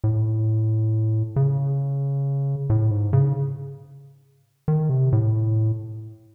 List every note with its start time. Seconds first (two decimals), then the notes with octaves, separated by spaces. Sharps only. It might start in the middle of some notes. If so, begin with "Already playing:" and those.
0.04 A2
1.36 C#3
2.70 A2
2.91 G#2
3.13 C#3
4.68 D#3
4.89 C3
5.12 A2